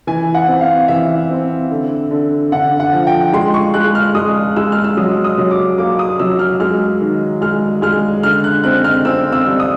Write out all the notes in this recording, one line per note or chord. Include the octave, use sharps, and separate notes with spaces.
E3 G#5
F#5
C4
F5
E3 E5
C4
D3
D3
D3 F#5
F#5
F3
G5
G#3 C6
C#6
G#3 F#6
F6
G#3 D#6
G#3 E6
F6
E6
F#3 D#6
D#6
F#3
D6
A#3 D6
D#6
F#3 E6
F6
G#3 F6
D#3
G#3 F6
G#3 F6
D3 F6
F#6
C4 F#6
F6
C4 E6
E6
G3
D#6